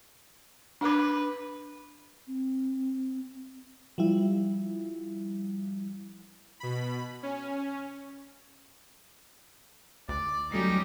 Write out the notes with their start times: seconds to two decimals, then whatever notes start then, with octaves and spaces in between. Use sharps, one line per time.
0.81 D4 B4 D6
2.27 C4
3.98 F3 G3 E4
6.60 B2 B5
7.23 C#4
10.09 D2 D5
10.52 F#3 G3 A3 C#4 D#4 G4 C7